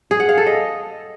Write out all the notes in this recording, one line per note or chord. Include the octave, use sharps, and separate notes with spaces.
G#4
F#5
F5
A4
D#5